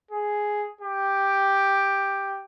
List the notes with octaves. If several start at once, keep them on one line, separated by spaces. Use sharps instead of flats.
G#4
G4